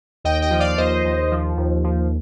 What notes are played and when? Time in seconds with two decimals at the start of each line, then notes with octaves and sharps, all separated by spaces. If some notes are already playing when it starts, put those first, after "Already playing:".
0.24 D#2 D#5 G5
0.42 D#5 G5
0.51 F3
0.60 D5 F5
0.78 D#2 C5 D#5
1.05 D#2
1.32 F3
1.57 D#2
1.84 F3